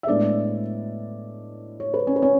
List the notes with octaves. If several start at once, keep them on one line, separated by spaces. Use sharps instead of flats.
E5
A2 G#3 B3 D4 D5
C#5
B4
C#4 C#5
B4
C#4 C#5